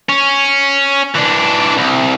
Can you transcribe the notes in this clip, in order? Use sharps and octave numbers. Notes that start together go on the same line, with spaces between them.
C#4
E3 D4
C2